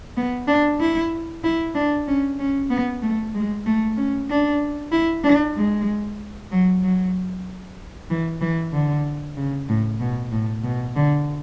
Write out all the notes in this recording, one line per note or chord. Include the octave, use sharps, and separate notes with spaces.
B3
D4
E4
E4
D4
C#4
C#4
B3
A3
G#3
A3
C#4
D4
E4
D4
G#3
F#3
F#3
E3
E3
D3
C#3
A2
B2
A2
B2
D3